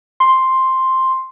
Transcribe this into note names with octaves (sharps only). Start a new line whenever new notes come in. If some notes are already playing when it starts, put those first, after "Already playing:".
C6